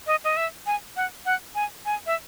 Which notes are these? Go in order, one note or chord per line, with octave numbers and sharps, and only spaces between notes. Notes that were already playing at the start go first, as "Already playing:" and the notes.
D#5
D#5
E5
G#5
F#5
F#5
G#5
G#5
E5